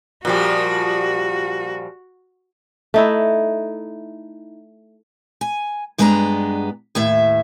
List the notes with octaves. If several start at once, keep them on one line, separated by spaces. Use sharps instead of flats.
A#2 F3 G3 F#4
A3 D#4 E4
G#5
G2 G#3 B3 D4 G#5 A#5
D#2 A2 E5